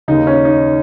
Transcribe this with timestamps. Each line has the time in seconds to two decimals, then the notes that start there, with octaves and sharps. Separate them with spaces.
0.08 D#2 C#3 D#4
0.27 C#4
0.45 D#4